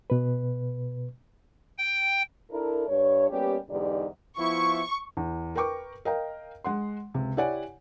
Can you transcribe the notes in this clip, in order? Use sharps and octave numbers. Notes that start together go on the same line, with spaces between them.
B2 B4
G5
D4 E4 A4 A#4
G2 C#5
G3 A#3 B3 C#4 G4
E2 G#2 D3 D#4 G4 D5
F3 B3 E4 C#6
E2
A#4 B4 G5 C#6 D6
A#4 D#5 F5 G5 A#5
G#3 F#5 C6
C#2 C3
E4 G4 C#5 D5 F#5 G#5